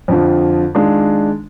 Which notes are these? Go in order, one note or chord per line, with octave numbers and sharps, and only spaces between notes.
F2 D3 F3
D#3 G#3 D4 F4